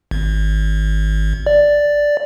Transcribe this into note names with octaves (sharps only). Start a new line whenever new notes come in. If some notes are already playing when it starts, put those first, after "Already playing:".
G#1
D5